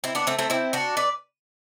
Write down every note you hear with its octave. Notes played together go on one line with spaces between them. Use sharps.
C4 E4
B3 D4
A3 C4
A3 C4
C4 E4
D4 F#4
B4 D5